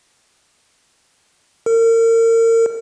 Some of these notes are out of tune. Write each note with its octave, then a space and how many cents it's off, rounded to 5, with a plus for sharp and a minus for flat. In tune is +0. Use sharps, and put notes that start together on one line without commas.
A#4 -35